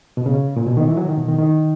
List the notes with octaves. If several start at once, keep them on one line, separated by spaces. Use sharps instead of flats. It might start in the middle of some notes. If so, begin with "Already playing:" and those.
B2
C#3
A#2
B2
D#3
E3
F#3
D#3
B2
D#3
D#3